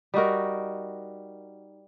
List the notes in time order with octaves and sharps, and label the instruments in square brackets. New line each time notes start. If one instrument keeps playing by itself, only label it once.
[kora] G3 D#4 F#4 A#4